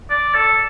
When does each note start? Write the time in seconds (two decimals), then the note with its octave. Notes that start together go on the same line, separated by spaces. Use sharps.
0.10 D5
0.34 A4